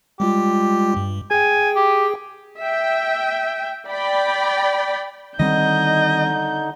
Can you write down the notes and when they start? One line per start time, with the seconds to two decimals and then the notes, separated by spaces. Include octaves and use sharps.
0.20 G3 G#3 F4 G4
0.97 G2
1.31 G#4 G5 G#5
1.76 G4
2.60 E5 G5
3.89 D5 G5 B5
5.39 D3 D#3 G3 C4 D#4 D#5 G6